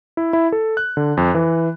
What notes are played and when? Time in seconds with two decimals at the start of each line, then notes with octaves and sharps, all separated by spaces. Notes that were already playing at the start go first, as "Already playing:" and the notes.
0.17 E4
0.33 E4
0.52 A4
0.77 F#6
0.97 D3
1.17 F2
1.35 E3